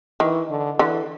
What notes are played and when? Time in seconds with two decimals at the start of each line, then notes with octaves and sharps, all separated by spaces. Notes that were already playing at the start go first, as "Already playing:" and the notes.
0.20 D#3 E3
0.50 D3
0.78 D3 E3